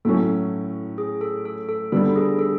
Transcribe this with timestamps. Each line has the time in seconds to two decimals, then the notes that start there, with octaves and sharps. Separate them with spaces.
0.05 A2 F#3 A3 C#4 A4
0.98 G#4
1.21 A4
1.45 A4
1.69 A4
1.92 D3 G3 B3 A4
2.16 G#4
2.39 A4